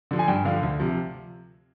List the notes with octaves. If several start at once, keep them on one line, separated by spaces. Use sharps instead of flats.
D3 F3
G#5
G2 G5
D3 F3 F5
D2
C3 F3